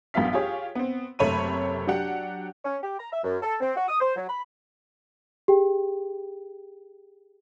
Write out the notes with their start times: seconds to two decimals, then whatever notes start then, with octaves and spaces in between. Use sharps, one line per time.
0.14 A1 F#2 B3 F4 F5 B6
0.33 F4 G4 G#4 C#5
0.75 B3 C4
1.19 F#1 C3 A3 C#5 B5 D#7
1.87 F#3 D4 G4 F#5
2.65 C#4
2.83 G4
2.99 A#5
3.12 E5
3.24 F#2
3.42 A4
3.60 C4
3.76 F#4
3.88 D#6
4.00 C5
4.16 F#3
4.29 B5
5.48 G4 G#4 G5